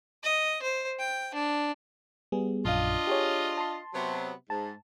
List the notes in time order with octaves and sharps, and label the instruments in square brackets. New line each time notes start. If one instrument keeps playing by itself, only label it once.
[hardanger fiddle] D#5
C5
G5
D4
[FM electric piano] G3 B3 G#4
[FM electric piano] A#1 F#2 F5 [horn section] D4 F4 D#5
[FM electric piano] G4 G#4 C#5
A5 C6
[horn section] C3 F#3 B3
[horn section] G#2 [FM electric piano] A5